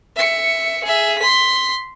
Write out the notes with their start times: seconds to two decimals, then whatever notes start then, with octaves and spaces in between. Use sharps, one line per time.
0.16 E5 C#7
0.84 G#4 E5
1.19 C6 B6